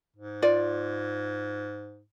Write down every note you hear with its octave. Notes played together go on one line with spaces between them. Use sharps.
G#2
F4 D5